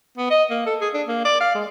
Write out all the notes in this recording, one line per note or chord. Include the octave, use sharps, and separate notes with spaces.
B3
D#5
A#3
A4
G#4
D4
A#3
D5
F5
G#3